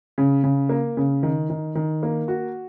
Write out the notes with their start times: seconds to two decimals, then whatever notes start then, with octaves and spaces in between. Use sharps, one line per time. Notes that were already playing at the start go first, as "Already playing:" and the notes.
0.18 C#3
0.44 C#3
0.69 A#3
0.97 C#3
1.23 D#3
1.50 D#3
1.75 D#3
2.03 A#3
2.28 F#4